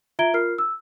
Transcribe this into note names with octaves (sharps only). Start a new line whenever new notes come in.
F4 E5 A#5 G#6 D7 G7
F4 A#4 F6 C7
E6